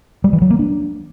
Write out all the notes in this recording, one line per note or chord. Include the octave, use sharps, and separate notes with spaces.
G3
E3
F#3
A#3
D4